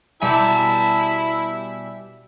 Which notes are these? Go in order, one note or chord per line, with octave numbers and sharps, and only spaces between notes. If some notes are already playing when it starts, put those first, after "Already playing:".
B2 G3 E4 E5 G#5 A5